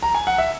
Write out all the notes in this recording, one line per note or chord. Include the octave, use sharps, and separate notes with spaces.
A#5
G#5
F#5
E5